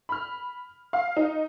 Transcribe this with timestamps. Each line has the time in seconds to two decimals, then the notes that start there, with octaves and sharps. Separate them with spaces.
0.09 B5 F6
0.93 F5
1.16 D#4